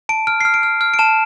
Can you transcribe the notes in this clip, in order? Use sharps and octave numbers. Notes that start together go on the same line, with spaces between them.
A5 D7
F6 D7
F6 C7
D7
F6
F6
D7
A5 E7